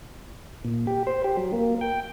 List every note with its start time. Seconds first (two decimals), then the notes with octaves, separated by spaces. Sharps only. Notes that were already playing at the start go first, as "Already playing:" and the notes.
0.65 A#2
0.87 G4
1.07 C5
1.24 G4
1.37 F#3
1.53 A#3
1.81 G5